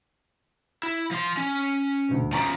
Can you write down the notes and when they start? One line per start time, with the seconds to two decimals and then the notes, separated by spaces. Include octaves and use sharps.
0.83 E4
1.11 F3 C6
1.37 C#4
2.09 D#1 D2
2.32 C#3 F3 A#5 C#6 D7